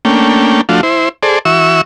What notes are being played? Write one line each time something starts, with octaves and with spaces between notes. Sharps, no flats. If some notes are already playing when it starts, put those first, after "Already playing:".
A3 A#3 C#4 D4 G5
F3 A3 D4 F4 F#4
E4 C5
G#4 A4 C5 D5
E3 F#4 E5 C#6 E6